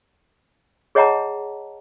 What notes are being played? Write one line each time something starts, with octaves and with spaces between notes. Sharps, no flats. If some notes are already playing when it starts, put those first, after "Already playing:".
G#4 C#5 D#5 F#5 A5 A#5